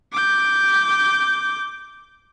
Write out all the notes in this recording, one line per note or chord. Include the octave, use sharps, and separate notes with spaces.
D6 G6